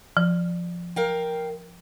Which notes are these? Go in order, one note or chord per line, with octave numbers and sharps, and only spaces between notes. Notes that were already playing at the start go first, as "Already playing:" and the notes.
F3
A#4 F5 G5